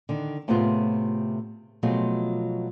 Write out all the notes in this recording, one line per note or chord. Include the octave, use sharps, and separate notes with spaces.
D3 D#3 D4
A2 C3 A3 B3 F4 G#4
B2 F3 F#3 A3 F4 G#4